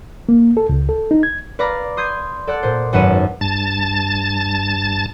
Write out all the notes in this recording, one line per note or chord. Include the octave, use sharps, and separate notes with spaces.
A#3
A4
C#2
A4
D#4
G#6
B4 D5 F5 A#5 D6
C6 D#6 G6 G#6 C7
A4 D5 F#5 A5 F#6
A#2 C5
G#1 F#2 B4 F#5 A5 D#7
G2 A5 A6